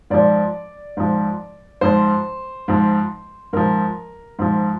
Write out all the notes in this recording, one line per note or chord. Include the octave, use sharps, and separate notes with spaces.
G#2 F3 D5
G#2 F3
G#2 F3 C5
G#2 F3
G#2 F3 A#4
G#2 F3